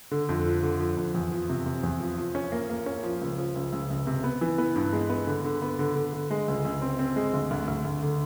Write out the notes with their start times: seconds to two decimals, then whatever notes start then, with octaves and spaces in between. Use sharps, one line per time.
0.11 D3
0.29 F2
0.46 F3
0.63 D3
0.80 F3
0.97 F2
1.14 E2
1.32 F3
1.49 C3
1.66 C3
1.83 E2
2.00 F3
2.18 F3
2.35 C#4
2.52 A#3
2.69 A#3
2.86 C#4
3.04 F3
3.21 C#2
3.38 F3
3.55 C#2
3.72 C#2
3.90 C#2
4.07 C3
4.24 B3
4.41 E3
4.58 B3
4.76 G2
4.93 G#3
5.10 B3
5.27 D3
5.45 D3
5.62 B3
5.79 D3
5.96 D3
6.13 D3
6.30 G#3
6.48 C#2
6.65 C#2
6.82 C4
6.99 C4
7.16 G#3
7.34 D2
7.51 D2
7.68 D2
7.85 D2
8.02 D3